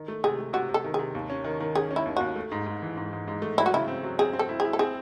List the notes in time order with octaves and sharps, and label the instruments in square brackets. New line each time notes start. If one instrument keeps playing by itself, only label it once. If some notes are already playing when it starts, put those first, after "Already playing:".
Already playing: [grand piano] D#3
A3
[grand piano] C3 [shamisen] G#4
[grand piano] A3
[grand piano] C3 [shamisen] F#4
[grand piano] C3
[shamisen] A4
[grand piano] D#3
[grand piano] C3 [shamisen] G#4
[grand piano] D#2
C#4
D#3
D#3
[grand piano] C#4 [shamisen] G#4
[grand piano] C#4
[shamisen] E4
[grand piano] D#2
[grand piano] D#2 [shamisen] F#4
[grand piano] A3
G#2
G#2
E3
G#2
G#2
G#2
A3
[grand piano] F#3 [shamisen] E4
[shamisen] F#4
[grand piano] C#3 [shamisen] E4
[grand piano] C4
F#3
[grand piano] C4 [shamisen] G#4
[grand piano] C4
[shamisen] A4
[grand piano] E4
[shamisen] G#4
[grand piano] E4
[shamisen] A4
[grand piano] C4 [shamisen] G#4